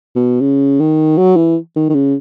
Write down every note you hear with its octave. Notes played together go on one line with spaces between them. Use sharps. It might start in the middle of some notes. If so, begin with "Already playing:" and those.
B2
C#3
D#3
F#3
E3
D#3
D#3
C#3